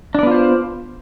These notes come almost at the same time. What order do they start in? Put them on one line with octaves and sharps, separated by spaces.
D4 D5 B3 F4 C5